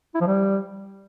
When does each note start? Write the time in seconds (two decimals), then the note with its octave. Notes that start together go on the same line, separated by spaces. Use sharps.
0.15 E4
0.21 F3
0.27 G3